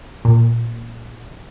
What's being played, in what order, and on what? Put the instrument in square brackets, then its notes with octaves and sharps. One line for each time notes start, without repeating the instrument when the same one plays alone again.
[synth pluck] A#2